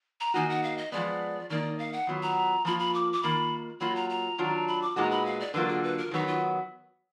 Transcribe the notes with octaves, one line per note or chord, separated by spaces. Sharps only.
A#5
D#3 A#3 D#4 F#4 G#5
F#5
F5
D#5
F3 G#3 B3 D5
D#3 A#3 D#4 D5
F5
F#5
D#3 F#3 B3 F4
A#5
F3 A#3 F4 B5
B5
D6
D6
D#3 A#3 F4 B5
F#3 A#3 F4 B5
A#5
A#5
D#3 F#3 D4 F4
B5
D6
A#2 G#3 B3 D#4 F#4 A#5
B5
F5
D5
D3 F#3 A#3 F4 B4
G#4
B4
A#4
D#3 F#3 B3 D#4
F4